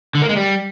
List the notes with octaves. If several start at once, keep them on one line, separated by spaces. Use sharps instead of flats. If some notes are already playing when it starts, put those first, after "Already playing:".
D3
A#3
G#3
G3